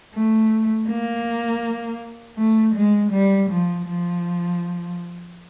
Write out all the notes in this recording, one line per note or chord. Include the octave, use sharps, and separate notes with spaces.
A3
A#3
A3
G#3
G3
F3
F3